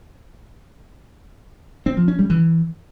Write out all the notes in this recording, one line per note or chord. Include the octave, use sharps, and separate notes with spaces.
C4
F3
C#4
G3
E3